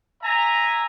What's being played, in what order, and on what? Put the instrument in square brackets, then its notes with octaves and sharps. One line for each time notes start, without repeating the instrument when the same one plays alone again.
[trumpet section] E5 G#5 A#5